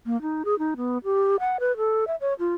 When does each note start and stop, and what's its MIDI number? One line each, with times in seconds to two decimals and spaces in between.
0.06 0.20 58
0.22 0.43 63
0.45 0.58 68
0.59 0.74 63
0.77 0.98 59
1.04 1.36 67
1.39 1.57 78
1.60 1.76 71
1.77 2.04 69
2.07 2.15 76
2.21 2.33 73
2.39 2.54 65